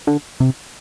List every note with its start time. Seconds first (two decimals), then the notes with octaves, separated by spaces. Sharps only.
0.07 D3
0.40 C3